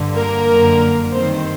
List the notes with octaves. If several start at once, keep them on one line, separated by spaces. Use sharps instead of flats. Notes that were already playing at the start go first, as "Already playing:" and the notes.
Already playing: G2 D3
A#3 A#4
F#2 D3
G2 D#3 C4 C5